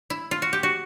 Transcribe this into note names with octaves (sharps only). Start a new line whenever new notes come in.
E4
F4
F#4
G4
F#4